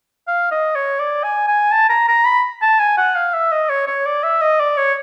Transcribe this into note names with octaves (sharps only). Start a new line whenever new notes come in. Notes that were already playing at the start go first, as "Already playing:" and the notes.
F5
D#5
C#5
D5
G#5
G#5
A5
A#5
A#5
B5
A5
G#5
F#5
F5
E5
D#5
C#5
C#5
D5
E5
D#5
D5
C#5